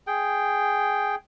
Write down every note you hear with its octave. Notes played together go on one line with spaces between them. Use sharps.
G#4 G5